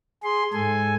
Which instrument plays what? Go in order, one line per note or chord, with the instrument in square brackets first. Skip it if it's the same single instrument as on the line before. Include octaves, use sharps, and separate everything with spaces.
[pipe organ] G#4 C6
G#2 A4 G#5